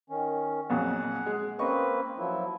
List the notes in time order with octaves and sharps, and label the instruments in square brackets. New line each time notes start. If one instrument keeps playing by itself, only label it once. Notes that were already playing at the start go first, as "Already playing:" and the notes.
[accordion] D#3 C#4
[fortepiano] F2 A#2 F#3 [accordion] G#4 F#5
[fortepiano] G#3
[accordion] A#3 C4 B4 [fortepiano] C#4 D#5 C#6
[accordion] F3 F#3 E4